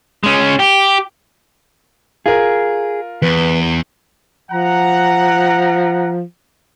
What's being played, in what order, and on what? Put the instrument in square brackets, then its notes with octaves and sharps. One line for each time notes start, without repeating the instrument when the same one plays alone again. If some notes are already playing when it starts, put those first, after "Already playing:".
[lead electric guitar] G#3 C#4
G4
[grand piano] F4 A#4 [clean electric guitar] G#4
[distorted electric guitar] E2 [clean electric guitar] B4
[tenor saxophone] F3 [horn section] F#5 A#5